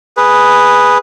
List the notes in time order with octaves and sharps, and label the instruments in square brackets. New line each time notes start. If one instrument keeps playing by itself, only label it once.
[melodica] G#4 B4